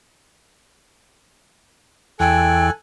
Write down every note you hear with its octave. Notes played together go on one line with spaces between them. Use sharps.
E2 A4 G5 G#5 F#6